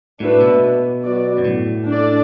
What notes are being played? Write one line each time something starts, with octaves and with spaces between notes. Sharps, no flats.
A2 D4 F#4 B4 E5
B2
F#3 B3 F#4 D5
F#2
A2
D4 A4 D5